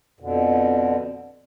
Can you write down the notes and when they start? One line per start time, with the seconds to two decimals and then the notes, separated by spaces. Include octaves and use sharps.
0.20 F2 B2 D3